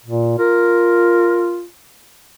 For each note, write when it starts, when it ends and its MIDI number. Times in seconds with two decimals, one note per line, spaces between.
0.06 0.34 46
0.38 1.65 65
0.38 1.58 70